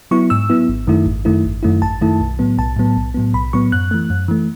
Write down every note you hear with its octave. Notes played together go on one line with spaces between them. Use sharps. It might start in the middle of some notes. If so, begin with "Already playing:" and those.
F#3 B3 E4 C#6
G#2 E6
F#3 B3 E4
G#1
F#2 D#3 A3 E4
G#1
F#2 D#3 A3 E4
G#1
F#2 D#3 A3 E4
G#1 A5
F#2 D#3 A3 E4
B1
A2 F#3 B3
B1 A5
A2 F#3 B3
B1
A2 F#3 B3
B1 B5
A2 F#3 B3 C#6
F#2 F#6
E3 A3
F#2
E3 A3